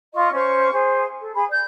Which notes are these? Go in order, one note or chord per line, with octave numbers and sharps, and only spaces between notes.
F4 D#5 C#6
C#4 C5 C#6
G#4 C5
A4
G#4 B5
D5 G6